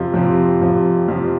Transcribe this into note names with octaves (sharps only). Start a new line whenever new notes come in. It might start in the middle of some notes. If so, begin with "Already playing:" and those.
Already playing: F2 C3 F3
F2 C3 F3
F2 C3 F3
F2 C3 F3